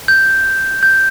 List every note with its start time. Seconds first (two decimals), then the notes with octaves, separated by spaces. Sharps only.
0.08 G6
0.83 G6